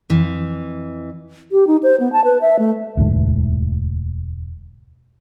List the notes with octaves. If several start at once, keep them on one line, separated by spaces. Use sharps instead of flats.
F2 E3
G4
D#4
C5
B3
A5
B4
E5
A3
E1 D2 G#2